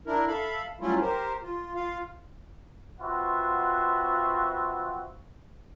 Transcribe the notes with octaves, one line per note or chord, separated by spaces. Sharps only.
D4 E4 A#4
A4 E5 F5 B5
F#3 G3 A3 C#4 E4 F4
G4 A#4 C5
F4
F4 F5
C4 F4 F#4 B4 E5 F#5